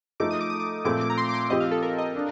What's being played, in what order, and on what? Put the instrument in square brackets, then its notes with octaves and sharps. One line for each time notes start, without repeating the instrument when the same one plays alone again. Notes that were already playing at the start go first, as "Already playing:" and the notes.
[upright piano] F3 A3 D#4 A4 [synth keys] D6
[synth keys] D#6
D6
D#6
D6
[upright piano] A#2 F3 A3 C4 [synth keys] D6
[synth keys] D6
A#5
C6
D6
C6
[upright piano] F3 C4 G4 [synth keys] D#5
[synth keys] F5
A4
A#4
D#5
[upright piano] D4